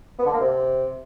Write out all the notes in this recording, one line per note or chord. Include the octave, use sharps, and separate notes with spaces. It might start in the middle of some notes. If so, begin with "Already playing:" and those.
B3
D3
A#3
C3